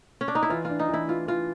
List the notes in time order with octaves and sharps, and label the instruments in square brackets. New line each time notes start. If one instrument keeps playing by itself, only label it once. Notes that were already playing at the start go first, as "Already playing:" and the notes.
[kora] C#4
D4
D#4
E4
[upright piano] E3 [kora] F4
[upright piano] D4 [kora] F4
[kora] D#4
[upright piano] E3 [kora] E4
[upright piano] E3 [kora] F4
[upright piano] E3 [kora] F4